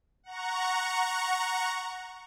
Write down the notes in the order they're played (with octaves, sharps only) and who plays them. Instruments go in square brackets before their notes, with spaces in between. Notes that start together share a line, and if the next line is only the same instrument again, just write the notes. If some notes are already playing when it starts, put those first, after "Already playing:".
[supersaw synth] F#5 A#5 C#6